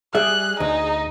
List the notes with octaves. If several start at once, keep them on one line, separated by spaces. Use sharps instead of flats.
G3 G#4 E5 F#6
D2 D#4